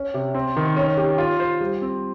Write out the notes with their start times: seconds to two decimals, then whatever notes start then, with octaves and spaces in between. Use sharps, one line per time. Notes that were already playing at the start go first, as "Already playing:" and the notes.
Already playing: C#4
0.14 C3
0.34 C4
0.57 D#3
0.76 C#4
0.97 G4
1.18 F4
1.40 C5
1.61 G3
1.82 C4